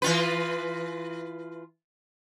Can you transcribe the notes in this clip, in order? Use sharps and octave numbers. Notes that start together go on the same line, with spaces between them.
E3 F4 B4